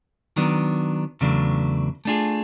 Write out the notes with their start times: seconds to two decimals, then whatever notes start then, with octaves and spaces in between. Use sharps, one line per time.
0.36 D#3 F#3 B3 D4
1.21 E2 C#3 F#3 A3 D4
2.05 A3 D4 F4 G#4